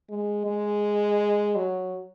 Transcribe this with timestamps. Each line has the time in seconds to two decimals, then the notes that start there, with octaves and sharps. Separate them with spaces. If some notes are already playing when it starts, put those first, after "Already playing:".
0.10 G#3
0.46 G#3
1.56 F#3